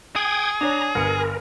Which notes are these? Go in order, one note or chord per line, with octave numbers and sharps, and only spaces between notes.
G#4 G5 D#6 G#6
D4 C#5 A#5
G1 A#4 C#7